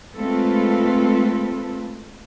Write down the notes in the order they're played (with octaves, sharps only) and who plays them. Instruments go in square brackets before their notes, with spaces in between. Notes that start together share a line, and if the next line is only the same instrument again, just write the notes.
[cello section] G#3 A3 C4 F4 A4 B4